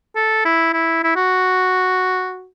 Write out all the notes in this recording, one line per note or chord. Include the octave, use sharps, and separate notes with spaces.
A4
E4
E4
E4
F#4